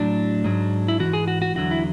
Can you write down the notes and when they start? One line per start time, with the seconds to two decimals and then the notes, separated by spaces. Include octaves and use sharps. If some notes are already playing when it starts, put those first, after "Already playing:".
Already playing: A2 F#3 D4
0.44 G#2 F#3
0.88 E4
1.00 G#2 E3 F#4
1.13 G#4
1.28 F#4
1.42 F#4
1.55 E2 D3 F#3 F#4
1.71 E4